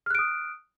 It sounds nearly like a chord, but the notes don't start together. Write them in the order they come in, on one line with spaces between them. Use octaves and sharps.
F6 F#6 D7 D#6